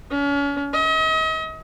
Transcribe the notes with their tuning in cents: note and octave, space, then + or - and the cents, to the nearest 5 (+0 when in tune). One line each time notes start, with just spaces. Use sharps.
C#4 +35
D#5 +40